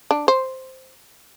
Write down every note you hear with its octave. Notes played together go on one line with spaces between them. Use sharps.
D4
C5